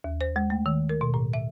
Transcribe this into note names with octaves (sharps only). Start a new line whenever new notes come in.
D#2
C5
G#3
A3
D#3
A#4
B2
A2
E5